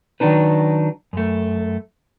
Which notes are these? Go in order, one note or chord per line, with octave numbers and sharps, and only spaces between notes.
D#3 F#3 D4 D#4 B4
F#2 A3